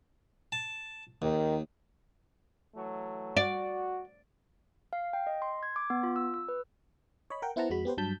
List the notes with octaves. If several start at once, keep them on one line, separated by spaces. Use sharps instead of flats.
A5
D#2 D#3
E3 F#3 A3
F#4 D5
F5
G5
D#5
C6
G#6
D6
B3
F4
E6
E6
B4
C#5 D#5 B5
A#4 F#5 G5
B3 E4 C5 F#5 A5 A#5
F2 G#3 F#4 B5
B3 G4 B4 C5
G2 F#3 A5 G6 B6